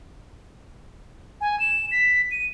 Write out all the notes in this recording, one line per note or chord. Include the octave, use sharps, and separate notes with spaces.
G#5
E7
B6
D#7